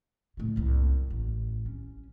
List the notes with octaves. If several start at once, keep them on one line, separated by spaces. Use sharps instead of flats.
A2 C#3
F#1 C2
A1
C#4